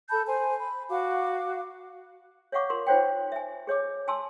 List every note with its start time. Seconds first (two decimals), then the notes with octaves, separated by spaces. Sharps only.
0.10 A4 A5 B5 G6
0.27 C5 G#5
0.59 B5
0.89 F#4 F5 D6
2.52 C#5 D#5 F5 F#5 C#6 D6
2.70 F4 A#4 C6
2.87 D#4 F4 C5 C#5 F#5 G5
3.32 E5 G#5
3.67 G#4 C#5 D#5 D6
4.08 G#5 A5 C6 E6